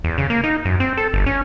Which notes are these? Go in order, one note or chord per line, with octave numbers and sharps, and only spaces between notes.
E2
C#3
A#3
D#4
F#2
C4
A4
G1
C#4